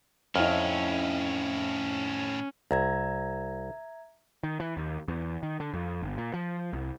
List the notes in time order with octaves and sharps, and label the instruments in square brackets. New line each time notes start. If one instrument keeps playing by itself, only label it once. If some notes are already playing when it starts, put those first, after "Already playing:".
[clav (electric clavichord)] F2 [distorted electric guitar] A2 D#3 [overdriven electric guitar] C#4 [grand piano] E4 D#5 F6
[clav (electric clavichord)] C2 [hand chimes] E5 A#5 G#6
[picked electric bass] D#3
E3
D#2
E2
D#3
D3
F2
G1
A#2
F3
C2